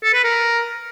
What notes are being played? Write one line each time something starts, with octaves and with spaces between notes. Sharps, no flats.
A4
B4
A#4